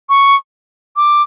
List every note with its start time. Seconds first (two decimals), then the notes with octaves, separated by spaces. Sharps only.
0.09 C#6
0.96 D6